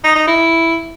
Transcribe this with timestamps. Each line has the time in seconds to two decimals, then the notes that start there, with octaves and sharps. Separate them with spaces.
0.04 D#4
0.16 D#4
0.27 E4